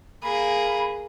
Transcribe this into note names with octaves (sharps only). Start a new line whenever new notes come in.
A#3 G#4 B5